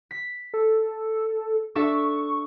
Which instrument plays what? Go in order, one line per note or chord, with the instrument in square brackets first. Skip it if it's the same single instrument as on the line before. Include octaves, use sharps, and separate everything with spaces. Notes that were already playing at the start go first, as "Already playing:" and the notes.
[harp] B6
[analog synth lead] A4
[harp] D4 A4 E5 [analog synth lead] C#6